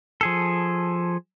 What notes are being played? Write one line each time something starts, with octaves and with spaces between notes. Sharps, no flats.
F3 G#4 A4